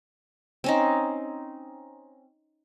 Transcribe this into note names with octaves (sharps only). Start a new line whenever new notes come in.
C4 C#4 D#4